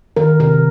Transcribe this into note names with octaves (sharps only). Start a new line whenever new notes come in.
D#3 A#4
C3 A#4